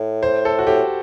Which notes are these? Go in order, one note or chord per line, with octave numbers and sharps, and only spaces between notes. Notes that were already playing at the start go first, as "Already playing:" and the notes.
Already playing: A2
C5
A4
F#4
A2 G4